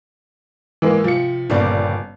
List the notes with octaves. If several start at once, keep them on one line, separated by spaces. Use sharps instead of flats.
E3 G#3 A#3
C3 F3 C#7
G1 A#2 C#3 G3 D5